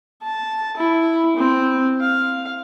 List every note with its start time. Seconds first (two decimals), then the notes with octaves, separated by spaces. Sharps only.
0.23 A5
0.77 E4
1.37 C4
2.00 F5